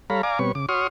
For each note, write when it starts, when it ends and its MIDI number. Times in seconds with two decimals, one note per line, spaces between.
0.10 0.22 55
0.10 0.22 69
0.10 0.22 73
0.10 0.22 77
0.10 0.22 82
0.10 0.22 83
0.23 0.39 74
0.23 0.39 77
0.23 0.39 80
0.23 0.39 82
0.23 0.39 86
0.39 0.52 47
0.39 0.52 55
0.39 0.52 60
0.39 0.52 71
0.39 0.52 73
0.39 0.52 85
0.55 0.66 49
0.55 0.66 86
0.69 0.87 66
0.69 0.87 73
0.69 0.87 84
0.69 0.87 85
0.69 0.87 87
0.69 0.87 89